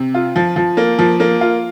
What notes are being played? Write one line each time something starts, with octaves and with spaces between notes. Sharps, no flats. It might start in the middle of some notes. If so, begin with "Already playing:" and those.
Already playing: C3
F4
F3
F3
A#3
F3
A#3
F4